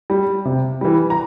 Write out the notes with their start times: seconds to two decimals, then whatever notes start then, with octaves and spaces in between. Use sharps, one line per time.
0.10 G3
0.45 C3
0.81 E3 G3
1.10 A#5